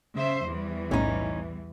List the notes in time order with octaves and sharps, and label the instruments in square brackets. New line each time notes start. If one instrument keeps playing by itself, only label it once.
[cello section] C#3 C5 E5
E2 E3 G3
[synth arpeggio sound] B1 A2 [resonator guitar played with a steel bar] C#4 D#4